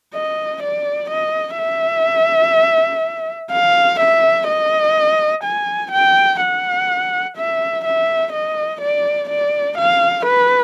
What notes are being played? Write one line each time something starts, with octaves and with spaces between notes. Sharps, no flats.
D#5
D5
D#5
E5
F5
E5
D#5
G#5
G5
F#5
E5
E5
D#5
D5
D5
F5
B4